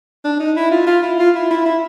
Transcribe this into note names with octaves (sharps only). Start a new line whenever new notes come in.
D4
D#4
E4
F4
F4
E4
F4
E4
E4
E4